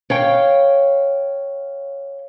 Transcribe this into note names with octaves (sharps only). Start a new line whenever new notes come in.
C#5 F5 G5